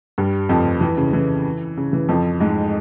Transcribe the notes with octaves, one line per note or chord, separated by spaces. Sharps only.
G2 G3
F2 F3
E3
C#3
E3
C#3
E3
F2 F3
G#2 G#3